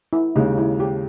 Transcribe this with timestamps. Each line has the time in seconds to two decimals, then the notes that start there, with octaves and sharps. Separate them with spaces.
0.13 E4
0.36 D#2 C#3 G#3 D#4
0.58 E4
0.80 G4